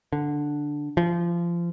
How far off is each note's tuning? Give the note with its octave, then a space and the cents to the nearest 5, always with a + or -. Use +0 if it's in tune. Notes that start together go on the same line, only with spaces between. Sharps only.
D3 +0
F3 -25